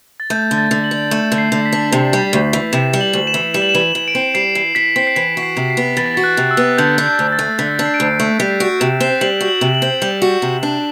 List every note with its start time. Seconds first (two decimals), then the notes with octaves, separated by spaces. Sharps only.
0.20 A6
0.30 A3 G6
0.51 D3
0.58 A6
0.71 D3
0.84 F#7
0.91 D4
1.11 A3 E7
1.32 D3
1.38 C7
1.52 D3
1.65 B6
1.73 D4
1.92 C3
2.13 G3
2.33 D2
2.53 E3
2.73 C3 E7
2.93 G3
3.01 F#7
3.13 D2
3.27 E7
3.34 E3
3.54 G3 E7
3.62 F#7
3.69 E7
3.75 E3
3.82 F#7
3.95 E3
4.08 D7
4.15 C4
4.35 G3 C7
4.55 E3 C7
4.75 E3 B6
4.96 C4 B6
5.07 C7
5.15 E3 B6
5.37 F#4
5.43 C7
5.57 C3
5.70 C7
5.77 B3
5.97 E3 A6
6.06 B6
6.15 F#4 A6
6.24 F#6
6.37 C3
6.51 E6
6.57 B3
6.78 D3 G6
6.98 D4
7.06 G6
7.19 D2
7.32 A6
7.39 A3
7.59 D3 B6
7.79 D4
7.86 C7
7.94 D7
8.00 D2 C7
8.19 A3
8.40 G3 B6
8.51 C7
8.60 F#4 D7
8.80 C3 E7
9.00 C4 E7
9.21 G3 F#7
9.41 F#4
9.48 F#7
9.61 C3
9.67 E7
9.75 F#7
9.82 C4
10.02 G3
10.22 F#4
10.42 C3
10.63 D4